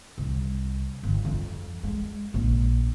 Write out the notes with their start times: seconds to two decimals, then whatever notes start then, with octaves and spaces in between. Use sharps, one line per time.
0.18 C2
1.03 G1
1.25 F2
1.83 G#3
2.34 A#1